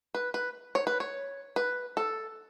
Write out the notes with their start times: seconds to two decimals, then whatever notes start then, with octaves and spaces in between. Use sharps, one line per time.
0.15 B4
0.34 B4
0.75 C#5
0.87 B4
1.00 C#5
1.56 B4
1.97 A4